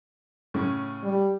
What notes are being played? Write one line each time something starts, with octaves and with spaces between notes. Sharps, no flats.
A2 C#3 C#4
G3